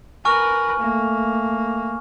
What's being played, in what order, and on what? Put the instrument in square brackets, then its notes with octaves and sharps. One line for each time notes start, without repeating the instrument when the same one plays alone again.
[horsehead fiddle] A#4 B4 [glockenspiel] G#5 C#6 F6
[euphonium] A3 [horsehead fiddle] A#3